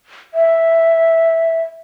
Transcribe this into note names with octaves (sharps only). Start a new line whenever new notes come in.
E5